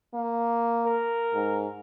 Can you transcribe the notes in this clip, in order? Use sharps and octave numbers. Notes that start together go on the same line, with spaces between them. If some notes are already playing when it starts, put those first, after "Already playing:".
A#3
A#4
G#2